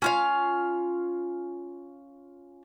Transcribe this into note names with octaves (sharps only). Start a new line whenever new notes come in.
C#4 F4 F5